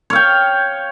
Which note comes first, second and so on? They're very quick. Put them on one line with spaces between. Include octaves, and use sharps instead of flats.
C#5 F5 G5